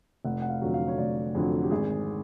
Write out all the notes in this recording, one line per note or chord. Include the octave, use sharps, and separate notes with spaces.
F1 F#5
F#5
F5
F2 D3 F#3
F5
C#5
F1 D5
F2 D3 F#3
G4
G#1 G#4